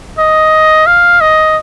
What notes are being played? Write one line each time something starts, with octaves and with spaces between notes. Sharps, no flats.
D#5
F5
D#5